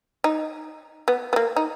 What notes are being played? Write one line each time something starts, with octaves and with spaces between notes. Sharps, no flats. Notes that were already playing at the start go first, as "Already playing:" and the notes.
D#4
B3
B3
A#3
D#4